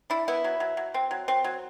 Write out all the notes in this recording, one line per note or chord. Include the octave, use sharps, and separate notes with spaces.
D4 E4
B3 E4
F#3
F#3
F#3
C4
F#3
C4
F#3